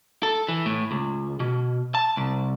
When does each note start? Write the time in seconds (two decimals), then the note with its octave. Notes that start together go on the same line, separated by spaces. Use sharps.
0.23 A4
0.49 E3
0.66 A2
0.91 C#2
1.40 B2
1.95 A5
2.17 C2